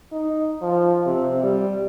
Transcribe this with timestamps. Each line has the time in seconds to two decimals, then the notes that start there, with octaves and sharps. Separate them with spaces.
0.12 D#4
0.62 F3
1.06 C3
1.43 G3